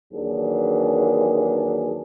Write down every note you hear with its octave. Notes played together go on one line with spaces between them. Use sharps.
D#2 E3 F#3 D4 G#4